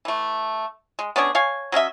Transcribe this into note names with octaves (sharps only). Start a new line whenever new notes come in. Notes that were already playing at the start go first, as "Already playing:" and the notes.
E3 A3
G#3
B3 C#4 D4 G#4
C#5 F5 G#5
F#3 C#4 D#5 E5